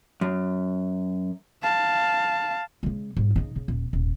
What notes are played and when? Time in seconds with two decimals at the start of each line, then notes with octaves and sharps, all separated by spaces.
0.21 F#2
1.62 F5 A5
2.83 C#3 G#3
3.17 G#2 G3
3.36 C#3 D#4
3.56 C#3
3.68 D#1
3.93 D#1 G#2